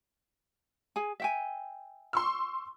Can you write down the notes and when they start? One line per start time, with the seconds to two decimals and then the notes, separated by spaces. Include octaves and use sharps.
0.96 G#4 G#5
1.20 E5 G5 G#5
2.13 C6 C#6 E6